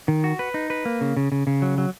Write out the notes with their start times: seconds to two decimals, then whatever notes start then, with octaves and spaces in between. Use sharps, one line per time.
0.08 D#3
0.24 F#4
0.39 B4
0.54 D#4
0.70 B4
0.85 A#3
1.01 C#3
1.17 C#3
1.32 C#3
1.47 C#3
1.62 F#3
1.78 F#3